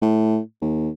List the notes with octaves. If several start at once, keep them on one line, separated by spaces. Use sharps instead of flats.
A2
D#2